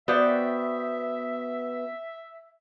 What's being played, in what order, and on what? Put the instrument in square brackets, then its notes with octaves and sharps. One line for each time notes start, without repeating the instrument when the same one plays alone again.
[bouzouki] B3 G5 [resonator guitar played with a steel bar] F#4 C5 D5 [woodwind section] E5